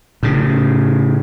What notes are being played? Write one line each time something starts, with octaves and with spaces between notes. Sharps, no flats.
A2 C#3